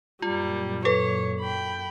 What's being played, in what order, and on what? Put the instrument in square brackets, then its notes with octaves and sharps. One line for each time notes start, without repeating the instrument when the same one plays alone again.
[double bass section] F#2 A#2 [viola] G3 [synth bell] F4
[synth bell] A4 [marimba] B4 [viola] C#5
[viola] G5 B5